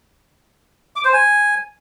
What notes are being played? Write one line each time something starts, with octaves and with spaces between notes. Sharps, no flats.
D6
C5
G#5